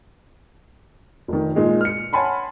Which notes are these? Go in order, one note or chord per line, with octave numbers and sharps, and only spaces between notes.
F1 D#3
A#2 G#3 D#4
F6 C#7
C#5 F#5 G#5 A5 B5 C6